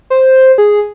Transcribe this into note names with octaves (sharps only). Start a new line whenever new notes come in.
C5
G#4